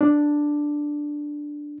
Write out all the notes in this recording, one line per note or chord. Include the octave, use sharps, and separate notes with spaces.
D4